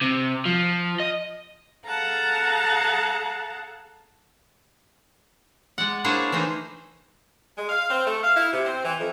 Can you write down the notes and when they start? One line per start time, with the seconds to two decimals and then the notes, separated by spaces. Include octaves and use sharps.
0.01 C3
0.45 F3
1.00 D#5
1.85 G#4 A4 F5 F#5 A5 A#5
5.78 G#3 D5 F#5
6.04 A#3 D4 E4 G#4 C5 C#5
6.32 E3 A3 D#4 C5
7.57 G#3
7.69 F5
7.90 C4
8.05 A3
8.24 F5
8.37 E4
8.53 C3
8.65 C4
8.84 E3
8.99 F2